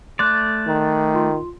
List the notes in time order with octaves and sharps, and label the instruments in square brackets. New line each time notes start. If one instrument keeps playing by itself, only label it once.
[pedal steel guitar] A3 D5 [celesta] C6 F#6
[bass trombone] D#3
[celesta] F4 C6